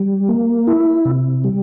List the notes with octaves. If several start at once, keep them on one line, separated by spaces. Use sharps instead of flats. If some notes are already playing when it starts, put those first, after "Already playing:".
Already playing: G3
A#3
E4
C3
G3